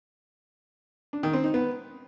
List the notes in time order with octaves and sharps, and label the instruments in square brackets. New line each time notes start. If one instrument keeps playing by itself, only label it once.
[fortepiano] D4
D#3
C4
D#4
B3